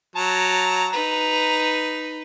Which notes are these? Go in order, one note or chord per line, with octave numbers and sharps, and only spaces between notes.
F#3 A5 A#5
D#4 B4 A#5